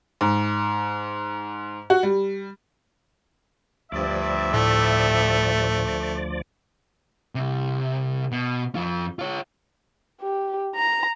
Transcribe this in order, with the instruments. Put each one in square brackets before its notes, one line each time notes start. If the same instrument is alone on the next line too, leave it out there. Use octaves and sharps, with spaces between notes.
[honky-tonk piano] G#2
F#4
G3
[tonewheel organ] D2 F3 D5 [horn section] G2 E5
[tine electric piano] A2 [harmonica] A3
[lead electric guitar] C2 C3
B2
F2 F4
F4 C#5
[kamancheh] G4
A#5